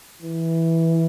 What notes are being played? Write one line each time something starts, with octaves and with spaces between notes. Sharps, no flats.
E3